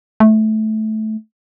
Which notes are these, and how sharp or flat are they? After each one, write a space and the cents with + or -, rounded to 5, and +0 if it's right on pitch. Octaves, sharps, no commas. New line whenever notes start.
A3 -15